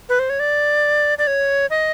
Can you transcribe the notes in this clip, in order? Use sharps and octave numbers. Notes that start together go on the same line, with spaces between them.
B4
C5
C#5
D5
D5
C#5
D#5